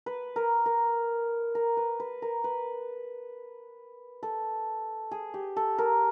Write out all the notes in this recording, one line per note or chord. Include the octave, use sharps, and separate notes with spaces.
B4
A#4
A#4
A#4
B4
B4
A#4
B4
A4
G#4
G4
A4
A#4